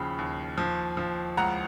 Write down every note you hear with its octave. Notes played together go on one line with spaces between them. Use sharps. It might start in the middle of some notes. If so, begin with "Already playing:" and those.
Already playing: D#2 C#3 F3 B5
D#2
F3
F3
C#2 F#5 A#5